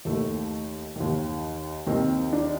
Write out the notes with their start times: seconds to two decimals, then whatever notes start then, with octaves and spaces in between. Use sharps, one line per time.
0.05 D#2 D#3 A3
0.96 D#2 D#3
1.87 D#2 D#3 C4
2.33 D4